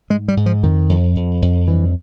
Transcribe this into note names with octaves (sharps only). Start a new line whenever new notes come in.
G#2 G#3
G3
G#2
F3
F2 D#3
F2
F2
F2
G2 E3